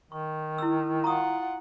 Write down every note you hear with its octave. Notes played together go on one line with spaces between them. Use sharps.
D#3 C#6
E4 E6
F4 F#5 A#5 C#6 D#6